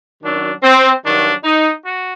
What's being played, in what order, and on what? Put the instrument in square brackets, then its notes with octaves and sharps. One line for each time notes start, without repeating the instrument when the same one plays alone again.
[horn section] F#2 D#3 F#3 D4
C4
G2 D#3 F#3 D4
D#4
F#4